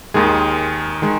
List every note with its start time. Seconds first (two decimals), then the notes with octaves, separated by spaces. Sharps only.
0.14 D#2 D#3 G#3 G#4
1.02 D#3 G#3